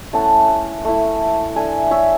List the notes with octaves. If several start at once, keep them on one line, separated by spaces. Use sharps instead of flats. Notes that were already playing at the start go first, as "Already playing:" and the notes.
A3 C#4 E4 F#5 A5
A3 E4
A3 D4 E5 G#5
C#5 E5